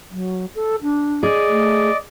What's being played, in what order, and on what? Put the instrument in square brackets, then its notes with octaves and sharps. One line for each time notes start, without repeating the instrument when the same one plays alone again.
[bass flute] F#3
A4
D4
[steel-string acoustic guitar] G#4 [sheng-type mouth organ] D5 D#5
[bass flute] A3